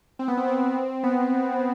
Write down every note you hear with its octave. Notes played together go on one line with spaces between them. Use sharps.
C4
B3
C4
C4
B3